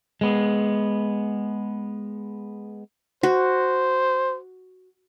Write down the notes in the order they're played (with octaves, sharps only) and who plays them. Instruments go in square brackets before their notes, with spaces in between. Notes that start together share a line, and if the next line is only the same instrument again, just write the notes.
[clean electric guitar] G#3 B3
[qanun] F#4 [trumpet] C5